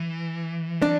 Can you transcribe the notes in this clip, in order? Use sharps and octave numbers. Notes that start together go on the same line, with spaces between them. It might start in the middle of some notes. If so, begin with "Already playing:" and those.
Already playing: E3
D4